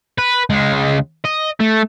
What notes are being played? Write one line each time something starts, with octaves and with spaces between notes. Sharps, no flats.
B4
C#2 G#3
D#5
A3